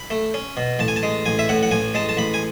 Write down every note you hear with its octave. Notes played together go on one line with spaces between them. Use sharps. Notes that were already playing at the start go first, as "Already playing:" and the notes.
Already playing: B5
A3
C#4
B2
A1 A5
G#5
A5
G#3
A1 G#5
E5
A2 F#5
F#5
A1 G#5
G#3 A5
A5
A1 B5
G#5